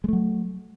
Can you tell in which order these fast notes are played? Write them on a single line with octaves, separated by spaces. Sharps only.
G#3 A3 F#3